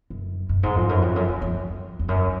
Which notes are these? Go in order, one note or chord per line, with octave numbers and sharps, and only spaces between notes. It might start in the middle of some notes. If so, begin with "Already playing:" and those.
F#2
F#2
G#2
F2
F#2
F2
F#2
F#2
F2
F2
F#2